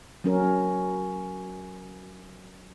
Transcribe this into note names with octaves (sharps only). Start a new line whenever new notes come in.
F#3 C#4 A#4